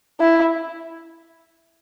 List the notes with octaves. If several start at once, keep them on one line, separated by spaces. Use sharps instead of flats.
E4